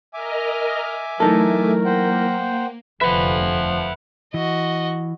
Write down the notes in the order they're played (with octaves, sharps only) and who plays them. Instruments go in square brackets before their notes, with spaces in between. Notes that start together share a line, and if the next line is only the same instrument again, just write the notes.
[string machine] A#4 D#5 F6 [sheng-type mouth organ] E5 G#5 D6
[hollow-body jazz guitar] E3 D#4 A4 [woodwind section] F#3 A#4 [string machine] A3
[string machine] A#3 [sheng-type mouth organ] C5 F#5 G5
[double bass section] F1 D3 [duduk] F3 [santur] B4 [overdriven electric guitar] E5 F#5
[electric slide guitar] E3 [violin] F#4 D#5